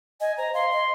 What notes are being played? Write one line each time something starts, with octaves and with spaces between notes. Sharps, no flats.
D#5 G#5
C5 A#5
F5 C6
D#5